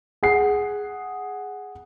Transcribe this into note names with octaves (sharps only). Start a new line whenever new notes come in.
G#4 F#5 C7